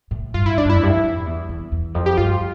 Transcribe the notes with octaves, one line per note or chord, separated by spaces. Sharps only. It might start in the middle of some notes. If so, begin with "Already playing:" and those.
A2
G2 F4
E4
D4
G2
F2 E4
G2
F2
E2
E2
E2
F2
G4
G2 F4